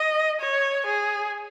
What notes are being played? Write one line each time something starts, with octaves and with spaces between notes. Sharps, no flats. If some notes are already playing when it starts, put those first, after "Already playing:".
Already playing: D#5
C#5
G#4